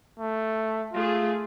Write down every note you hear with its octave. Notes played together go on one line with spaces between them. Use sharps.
A3
A3 F4 G#4